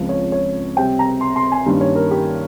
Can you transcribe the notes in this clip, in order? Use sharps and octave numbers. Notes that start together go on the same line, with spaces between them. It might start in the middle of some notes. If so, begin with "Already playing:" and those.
Already playing: C#2 C#3 F3 C4
C#5
C#5
C3 G3 C4 G5
A#5
C6
C6
G#5
G2 D#3 A#3 C#4
C#5
A#4
G4